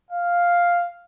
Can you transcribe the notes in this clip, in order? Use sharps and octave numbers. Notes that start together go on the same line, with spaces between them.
F5